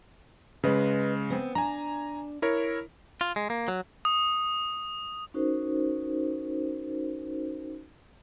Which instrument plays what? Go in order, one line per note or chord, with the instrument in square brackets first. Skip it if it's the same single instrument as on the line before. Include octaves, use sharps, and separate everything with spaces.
[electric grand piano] C#3 G#3 [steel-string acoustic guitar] B4 D#5
[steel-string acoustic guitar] B3 C4
[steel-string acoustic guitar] D4 [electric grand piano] G#5 A#5
[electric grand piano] E4 A#4 C#5
[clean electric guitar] F4
G#3
A#3
F#3
[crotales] D#6
[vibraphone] C#4 D#4 F#4 A#4 C5